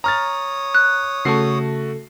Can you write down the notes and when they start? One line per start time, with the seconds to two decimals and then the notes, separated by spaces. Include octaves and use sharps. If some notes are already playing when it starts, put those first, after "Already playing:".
0.04 C#5 A#5 D#6 F6 A6
0.74 F#6
1.25 C#3 A3 F#4 A4 C7